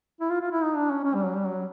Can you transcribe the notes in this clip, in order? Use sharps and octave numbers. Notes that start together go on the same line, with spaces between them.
E4
F4
F4
E4
D#4
D4
C#4
C#4
G3
F#3
G3
F#3